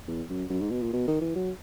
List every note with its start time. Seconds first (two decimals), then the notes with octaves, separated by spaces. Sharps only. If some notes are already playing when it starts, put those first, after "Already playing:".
0.07 E2
0.29 F#2
0.50 F#2
0.61 G#2
0.71 B2
0.82 A#2
0.93 B2
1.07 D#3
1.21 E3
1.35 F#3